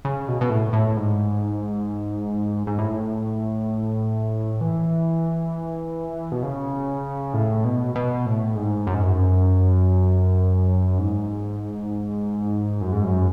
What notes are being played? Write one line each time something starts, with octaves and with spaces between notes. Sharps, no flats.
C#3
B2
B2
A2
A2
G#2
G#2
A2
E3
B2
C#3
A2
B2
B2
A2
G#2
F#2
G#2
F#2
G#2
F#2
G#2
F#2